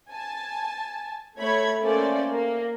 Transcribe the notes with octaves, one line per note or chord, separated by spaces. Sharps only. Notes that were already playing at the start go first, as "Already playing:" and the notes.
G#5 A5
A3 C#5 B5 G#6
A3 A#3 C#4 A4 C5 D5
A#3